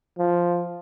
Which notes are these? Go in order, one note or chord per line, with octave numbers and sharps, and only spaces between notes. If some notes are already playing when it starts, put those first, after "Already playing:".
F3